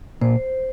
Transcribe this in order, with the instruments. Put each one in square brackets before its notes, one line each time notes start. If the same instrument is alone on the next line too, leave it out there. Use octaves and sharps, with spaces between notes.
[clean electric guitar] A#2 [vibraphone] C5